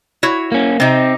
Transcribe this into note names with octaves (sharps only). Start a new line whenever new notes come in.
E4 F#4 C#5
A#3 C#4
C3 C4 D#4